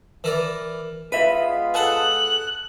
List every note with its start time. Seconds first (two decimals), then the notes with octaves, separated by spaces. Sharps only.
0.24 E3 A#4 D5
1.12 G#3 B3 F4 B4 E5 B5
1.74 G#4 A4 F#5 F#6